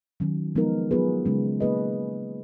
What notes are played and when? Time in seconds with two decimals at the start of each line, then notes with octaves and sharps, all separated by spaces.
0.20 D#3 F#3 C#4
0.55 F3 G#3 B3 D#4 A#4
0.91 F#3 B3 F4 G#4 B4
1.25 C#3 G#3 C#4
1.61 A#3 D#4 G#4 B4 D#5